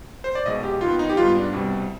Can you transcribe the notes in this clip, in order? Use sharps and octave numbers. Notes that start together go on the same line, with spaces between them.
C5
D5
B1 B2 G#3 D#5
G4
D#2 D#3 B3 F4
D#4
G4
G#2 G3 B3 F4
D4
C2 B2 G3 C4